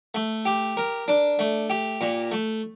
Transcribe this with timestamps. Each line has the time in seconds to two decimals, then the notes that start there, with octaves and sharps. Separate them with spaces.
0.15 A3
0.46 G4
0.77 A#4
1.08 D4
1.39 A3
1.70 G4
2.01 A#2
2.32 A3